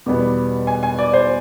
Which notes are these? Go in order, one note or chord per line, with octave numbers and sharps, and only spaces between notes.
E2 B2 G3 B3
G#5
G#5
D5
C5